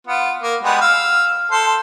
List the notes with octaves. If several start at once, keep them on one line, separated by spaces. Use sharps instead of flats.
B3 F4
A#3
G3 G#3 B3
F5 E6
A4 C5 C6